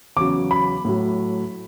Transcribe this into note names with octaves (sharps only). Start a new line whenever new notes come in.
E2 C#3 F#3 D6
B5
A2 F#3